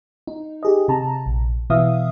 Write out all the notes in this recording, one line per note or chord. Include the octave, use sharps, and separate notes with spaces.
D#4
G4 G#4 D#5
C3 A5 A#5
A#1
B2 E3 B3 E5 F5 D#6